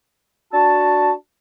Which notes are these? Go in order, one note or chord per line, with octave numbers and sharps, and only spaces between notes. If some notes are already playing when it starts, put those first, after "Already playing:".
D4 F#4 A5